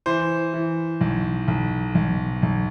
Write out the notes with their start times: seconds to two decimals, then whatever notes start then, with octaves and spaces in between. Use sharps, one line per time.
0.06 E3 C5
0.54 E3
1.01 B1
1.48 B1
1.95 B1
2.43 B1